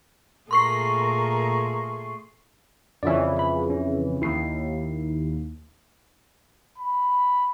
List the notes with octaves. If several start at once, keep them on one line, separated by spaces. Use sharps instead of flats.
A#2 A3 G#4 A#4 C6 C#6 C7
F2 C#3 E3 D5 E5
B5
C#4
D#2 E4 C7
B5